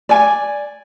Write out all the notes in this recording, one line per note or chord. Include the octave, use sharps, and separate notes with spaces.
D5 G#5